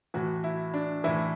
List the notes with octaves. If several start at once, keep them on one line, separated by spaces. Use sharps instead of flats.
A2 E3 F#4
E4
D4
A2 E3 E4